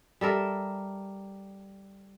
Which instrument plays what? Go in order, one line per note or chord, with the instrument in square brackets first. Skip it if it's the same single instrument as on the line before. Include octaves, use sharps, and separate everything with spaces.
[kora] G3 A4 A#4 E5